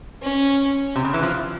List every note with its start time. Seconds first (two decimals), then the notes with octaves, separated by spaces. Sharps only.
0.22 C#4
0.96 C3
1.05 C#3
1.14 E3
1.23 F3